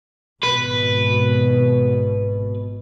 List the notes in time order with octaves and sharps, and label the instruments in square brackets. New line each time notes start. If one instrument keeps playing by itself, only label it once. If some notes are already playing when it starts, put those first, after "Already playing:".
[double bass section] G#1 B2 [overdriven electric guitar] B4